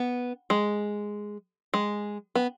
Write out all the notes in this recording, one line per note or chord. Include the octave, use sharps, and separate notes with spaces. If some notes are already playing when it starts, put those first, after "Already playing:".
Already playing: B3
G#3
G#3
B3